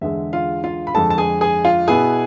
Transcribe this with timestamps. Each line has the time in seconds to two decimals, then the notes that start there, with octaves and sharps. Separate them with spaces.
0.01 E2 D3 G#3 E5
0.33 F4 F5
0.64 F4 F5
0.87 B5
0.94 F2 D3 G#3 A4 A5
1.10 A5
1.18 G#4 G#5
1.41 G#4 G#5
1.65 F4 F5
1.87 B2 B3 E4 G#4 G#5